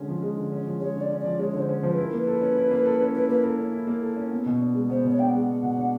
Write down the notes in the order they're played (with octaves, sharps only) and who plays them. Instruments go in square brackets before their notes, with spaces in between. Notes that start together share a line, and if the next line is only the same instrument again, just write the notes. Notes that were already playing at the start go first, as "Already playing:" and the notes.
Already playing: [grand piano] D3 G#3 C#4
F3
G#3
D3
C#4
F3
[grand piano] G#3 [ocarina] C#5
[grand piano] D3
[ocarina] D5
[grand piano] C#4
[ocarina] D5
[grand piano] F3
[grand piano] G#3 [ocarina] C#5
[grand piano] D3 [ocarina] C#5
[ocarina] C5
[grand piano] C#4
[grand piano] F3 [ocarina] C5
[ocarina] B4
[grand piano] E4
[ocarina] A#4
[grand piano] A#3
[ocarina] B4
[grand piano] A4
C#4
E4
A#3
A4
C#4
[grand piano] E4 [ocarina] B4
[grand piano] A#3 [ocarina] B4
[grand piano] A4 [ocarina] A#4
[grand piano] C#4
E4
A#3
A4
C#4
B3
B2
D4
G#3
[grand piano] B3 [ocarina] C5
[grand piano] B2 [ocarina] C#5
[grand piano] D4 [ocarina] G5
[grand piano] G#3 [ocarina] F#5
[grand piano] B3
B2
D4